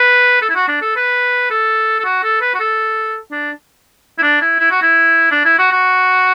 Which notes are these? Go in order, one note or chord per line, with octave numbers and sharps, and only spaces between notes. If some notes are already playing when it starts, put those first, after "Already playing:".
Already playing: B4
A4
E4
F#4
D4
A4
B4
A4
A4
F#4
A4
B4
F#4
A4
D4
E4
D4
E4
E4
F#4
E4
D4
E4
F#4
F#4